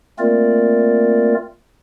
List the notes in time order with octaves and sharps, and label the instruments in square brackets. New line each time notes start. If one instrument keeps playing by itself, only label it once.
[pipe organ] A3 A#3 C4 F4 A#4 D5